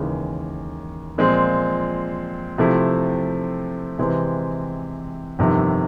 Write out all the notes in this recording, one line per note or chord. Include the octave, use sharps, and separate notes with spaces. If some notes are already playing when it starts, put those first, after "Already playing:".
Already playing: D#2 C#3 E3 G#3
A#2 F3 G#3 C4
C3 F3 A3 C4 E4
C3 E3 G#3 C4
G1 F2 C3 D#3